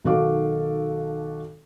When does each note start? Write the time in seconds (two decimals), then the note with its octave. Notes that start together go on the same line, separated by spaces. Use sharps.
0.04 B1 D#3 F#4 A4 F5 D6